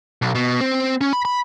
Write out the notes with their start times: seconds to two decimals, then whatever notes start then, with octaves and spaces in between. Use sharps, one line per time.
0.22 B1
0.35 B2
0.61 C4
1.01 C#4
1.13 B5
1.25 B5